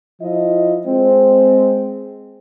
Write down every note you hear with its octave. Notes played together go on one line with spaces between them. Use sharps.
F3 E4 F4 D#5
G#3 C4